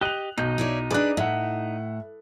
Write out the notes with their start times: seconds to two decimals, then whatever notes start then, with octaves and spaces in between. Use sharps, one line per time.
0.01 G4 D#5 F#6 F7
0.38 B1 D#3 D#4 G6
0.58 E4 C#5 D5
0.90 D4 G#4 B4 D5 F#6
1.17 A2 E5 F#5